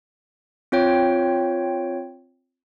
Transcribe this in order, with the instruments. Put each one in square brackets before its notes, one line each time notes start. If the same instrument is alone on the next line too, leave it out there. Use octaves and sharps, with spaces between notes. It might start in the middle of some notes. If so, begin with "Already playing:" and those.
[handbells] C4 F4 C#5 G5